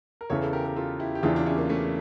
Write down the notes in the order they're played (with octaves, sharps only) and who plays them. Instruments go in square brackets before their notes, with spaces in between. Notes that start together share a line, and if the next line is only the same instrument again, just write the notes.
[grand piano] A#4
[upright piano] E2 C#3 E3 [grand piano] A4 C#5
[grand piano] A4
G4 A#4
A#4
F4 A4
E4 G4
G4
[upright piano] E2 C#3 E3 [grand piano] D4 F4
[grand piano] D4
C#4 E4
A#3
A3 C#4